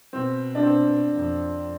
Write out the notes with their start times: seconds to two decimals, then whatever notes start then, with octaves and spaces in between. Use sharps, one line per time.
0.13 B2 C4
0.55 D4
0.63 C4
1.13 F2